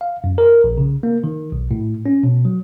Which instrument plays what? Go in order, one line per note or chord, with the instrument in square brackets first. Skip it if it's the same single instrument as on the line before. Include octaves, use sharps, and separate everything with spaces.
[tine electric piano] F5
F#2
A#4
A#1
C#3
A#3
D#3
B1
A2
C#4
B2
F#3